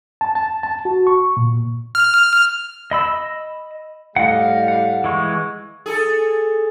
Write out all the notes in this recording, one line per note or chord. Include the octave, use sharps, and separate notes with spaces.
A5
A5
A5
F#4
C#6
A#2
F6
D#5 B5 E6
A2 G3 D#5 F5 F#5
F#5
E3 G#3 C#6
G#4 A4